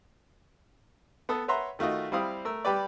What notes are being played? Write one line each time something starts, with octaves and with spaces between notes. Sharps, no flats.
B3 A4 D#6
B4 C#5 E5 F#5 A#5 C6
D#3 A3 F4 F#4 D#5
G3 C4 E4 F5 D#6
A3 A#4 E6
G3 G4 B4 D5